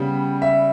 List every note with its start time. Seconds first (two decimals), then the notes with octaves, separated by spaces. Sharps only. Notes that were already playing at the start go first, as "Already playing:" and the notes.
Already playing: C#3 G3 B3
0.42 E5